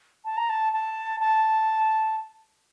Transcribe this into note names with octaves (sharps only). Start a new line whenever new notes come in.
A5
A#5
A5
A5
A5